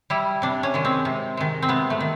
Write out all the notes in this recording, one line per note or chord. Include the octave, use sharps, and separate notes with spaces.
G3 E4
C3 D4
C#4
D#3 G#3
C4
C3
D#3 G#3
C4
C3 B3
A3
D#3